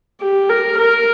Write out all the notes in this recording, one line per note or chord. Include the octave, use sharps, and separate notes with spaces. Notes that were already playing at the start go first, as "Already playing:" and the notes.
G4
A#4
A#4